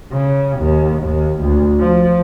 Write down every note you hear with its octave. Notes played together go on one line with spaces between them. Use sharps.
C#3
D#2
D#2
D2
F3